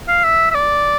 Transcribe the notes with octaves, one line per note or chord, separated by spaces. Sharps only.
F5
E5
E5
D5